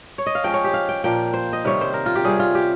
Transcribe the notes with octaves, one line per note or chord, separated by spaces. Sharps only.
C#5
D#5
F5
F3 G#3 C#4 G5
C#5
G4
F5
G5
A#2 F3 A#3 G5
C5
D#5
C3 D#3 G3 C#5
C5
A#4
F4
G4
C3 G3 C#4 G#4
F4
G4